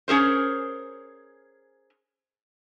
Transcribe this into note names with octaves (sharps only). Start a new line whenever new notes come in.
C#4 G#4 A#4 C5